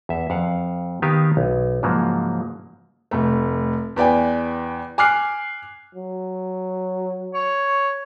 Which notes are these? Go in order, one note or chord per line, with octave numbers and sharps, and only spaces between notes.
E2 E5
F2 F5 F#5
D#3 B3 D#4 G4 F5 G#5
B1
G#2 C#3 F3 F#3 A#3
F1 A3
E2 B4 D5 G5 G#5
G#5 D6 F6 F#6 C7
F#3
C#5